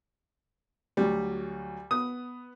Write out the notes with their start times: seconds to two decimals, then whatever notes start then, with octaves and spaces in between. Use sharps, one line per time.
0.97 D2 F#3 G3
1.91 B3 D#6